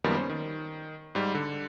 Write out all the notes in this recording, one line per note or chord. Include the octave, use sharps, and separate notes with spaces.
F#2 D#3 F3 G3 A#3 B3
C#4 C5
D#3
G#2 G3
D3